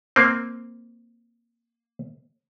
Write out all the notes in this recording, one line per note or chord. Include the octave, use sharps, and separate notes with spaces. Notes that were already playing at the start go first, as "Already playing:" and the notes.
A#3 C4